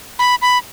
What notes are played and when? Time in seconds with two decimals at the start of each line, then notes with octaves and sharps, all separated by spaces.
0.19 B5
0.42 B5